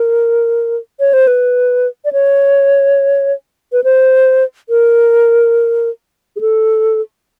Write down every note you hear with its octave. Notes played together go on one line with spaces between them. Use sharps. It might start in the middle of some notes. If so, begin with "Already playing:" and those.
Already playing: A#4
C#5
C5
B4
D5
C#5
B4
C5
A#4
G#4
A4